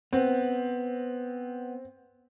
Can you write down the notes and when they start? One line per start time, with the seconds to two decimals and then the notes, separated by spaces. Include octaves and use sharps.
0.13 B3 C4